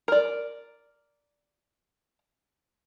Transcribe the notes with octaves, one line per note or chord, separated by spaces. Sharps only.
A#4 D5